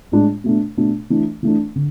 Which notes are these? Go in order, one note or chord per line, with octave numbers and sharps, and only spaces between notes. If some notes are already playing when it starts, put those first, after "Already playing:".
A2 G#3 D4
B2 A3 D4
B2 A3 D4
E3 A3 D4
E3 A3 D4
D3